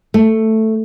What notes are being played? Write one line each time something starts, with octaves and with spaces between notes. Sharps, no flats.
A3